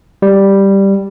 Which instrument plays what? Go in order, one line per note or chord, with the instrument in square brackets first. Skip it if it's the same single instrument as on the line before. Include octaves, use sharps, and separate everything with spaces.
[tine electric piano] G3